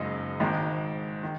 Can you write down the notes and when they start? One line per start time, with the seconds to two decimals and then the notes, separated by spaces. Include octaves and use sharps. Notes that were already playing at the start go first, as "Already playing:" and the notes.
Already playing: F#1 F#2 C#3 G#3 D#4
0.40 G#1 G#2 D#3 G#3
1.23 D#3